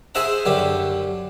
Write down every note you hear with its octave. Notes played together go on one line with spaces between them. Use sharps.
G#4 C5 E5 F#5 A#5
F#2 D3 G4